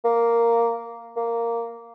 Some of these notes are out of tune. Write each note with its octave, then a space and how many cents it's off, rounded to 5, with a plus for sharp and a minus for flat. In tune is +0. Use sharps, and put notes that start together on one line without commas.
A#3 -5
A#3 -5